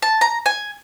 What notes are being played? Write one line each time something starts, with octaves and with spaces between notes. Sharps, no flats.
A5
A#5
G#5